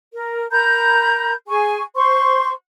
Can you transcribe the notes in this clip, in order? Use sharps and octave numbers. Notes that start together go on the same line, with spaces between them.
A#4
A#4 A#5 B5 G6
G#4 G#5 C#6
C5 C6 C#6